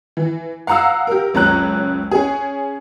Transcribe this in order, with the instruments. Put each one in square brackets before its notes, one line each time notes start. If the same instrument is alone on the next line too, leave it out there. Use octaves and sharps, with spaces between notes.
[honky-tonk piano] E3
F5 F#5 A#5 D#6 E6
G4 A#4
F#1 C#2 C#4 A#5 F#6
C#4 G#4